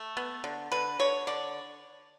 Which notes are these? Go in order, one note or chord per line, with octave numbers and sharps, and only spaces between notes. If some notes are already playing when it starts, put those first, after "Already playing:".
Already playing: A3
B3
D3
D3 B4
D3 C#5
D3 D5